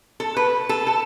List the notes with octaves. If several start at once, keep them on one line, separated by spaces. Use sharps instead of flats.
A4
B4
A4
A4